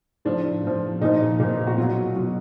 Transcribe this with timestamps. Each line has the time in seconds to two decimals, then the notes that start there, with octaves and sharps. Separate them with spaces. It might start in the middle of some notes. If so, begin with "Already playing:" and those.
0.25 A2 F3 D4
0.63 A2 F3
1.01 A#2 F3 D#4
1.40 A#2 F3
1.67 F#4
1.78 B2 F#3 F4
2.16 B2 F#3